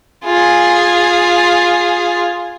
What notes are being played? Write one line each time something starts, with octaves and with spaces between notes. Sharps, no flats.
F4 G#4